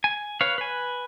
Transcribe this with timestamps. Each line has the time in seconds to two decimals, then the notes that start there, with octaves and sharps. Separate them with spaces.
0.04 G#5
0.41 B4 C#5 F5
0.58 B4 G#5